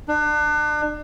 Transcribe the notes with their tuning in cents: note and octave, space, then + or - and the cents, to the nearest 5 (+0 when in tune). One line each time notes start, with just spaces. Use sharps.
D4 +35